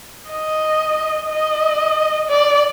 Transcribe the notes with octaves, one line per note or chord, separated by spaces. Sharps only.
D#5
D#5
D5